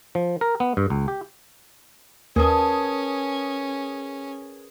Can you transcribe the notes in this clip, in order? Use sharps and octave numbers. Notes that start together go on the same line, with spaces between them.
F3
A#4
B3
G2
C#2
G4
D#2 C#4 G#4 A#4 B4 A5 D#6